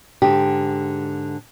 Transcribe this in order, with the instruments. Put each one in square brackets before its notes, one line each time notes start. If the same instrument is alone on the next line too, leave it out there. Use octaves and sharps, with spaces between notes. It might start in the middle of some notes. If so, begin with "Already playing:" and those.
[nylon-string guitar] G#2 D3 G4